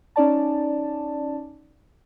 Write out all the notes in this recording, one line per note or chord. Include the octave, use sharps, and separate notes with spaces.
C#4 D#4 D5 A5